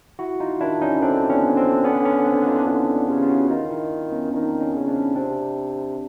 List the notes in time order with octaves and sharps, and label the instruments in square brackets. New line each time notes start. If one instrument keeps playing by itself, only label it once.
[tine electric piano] E4 F#4
D#4 F4
[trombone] D#3 [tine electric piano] D4 E4
[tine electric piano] C#4 D#4
[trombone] D3 [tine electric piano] C4 D4
[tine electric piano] B3 C#4
C4 D4
B3 C#4
B3 C#4
C4 D4
D#4 F4
[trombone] D3 [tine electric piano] D4 E4
[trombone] C#3 [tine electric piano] F4 G4
[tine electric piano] F4
E4 F#4
[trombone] D#3 [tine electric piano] D#4 F4
[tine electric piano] D4 E4
B3 C#4
[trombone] D#3 [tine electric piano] C4 D4
[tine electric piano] C#4 D#4
[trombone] C#3
[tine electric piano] C4 D4
[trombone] C3 [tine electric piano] C4 D4